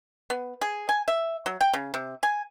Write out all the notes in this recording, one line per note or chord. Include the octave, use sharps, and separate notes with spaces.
B3
G#4
G#5
E5
F#3
G5
C#3
C3
G#5